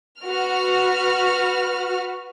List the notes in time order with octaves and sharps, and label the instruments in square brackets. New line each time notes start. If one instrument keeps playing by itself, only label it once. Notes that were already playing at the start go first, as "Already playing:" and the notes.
[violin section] F#4 B4 F6